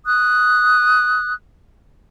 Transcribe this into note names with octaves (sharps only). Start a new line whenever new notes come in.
D#6 F#6